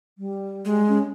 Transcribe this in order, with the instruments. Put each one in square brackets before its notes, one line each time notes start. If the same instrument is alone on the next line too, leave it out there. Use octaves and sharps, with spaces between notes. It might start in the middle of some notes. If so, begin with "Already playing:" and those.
[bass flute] G3
[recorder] G#3
[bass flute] C#4